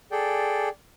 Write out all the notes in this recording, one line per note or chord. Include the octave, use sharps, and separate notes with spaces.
G#4 A4 D5 G5